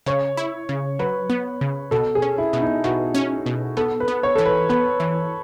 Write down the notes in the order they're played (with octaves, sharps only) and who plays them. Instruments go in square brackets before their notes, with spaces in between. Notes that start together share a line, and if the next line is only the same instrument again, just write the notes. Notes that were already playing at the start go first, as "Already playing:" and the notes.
[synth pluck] C#3 [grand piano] C#5
[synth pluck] E4
C#3
[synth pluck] F#3 [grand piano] B4
[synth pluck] B3
C#3
[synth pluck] B2 [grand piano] A4
[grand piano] G#4
[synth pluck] C#4
[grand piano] E4
[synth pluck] B2
[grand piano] D#4
[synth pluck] B2 [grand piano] F#4
[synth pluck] C#4
B2
[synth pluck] B3 [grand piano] A4
[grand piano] B4
[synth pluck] B3
[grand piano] C#5
[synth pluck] E3 [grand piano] A4
[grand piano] B4
[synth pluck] B3 [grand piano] B4
[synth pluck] E3